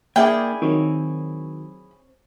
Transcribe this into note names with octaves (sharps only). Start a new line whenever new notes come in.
A#3 D4 E4 G#4 D5 G5
D#3 F#3 C4 C#5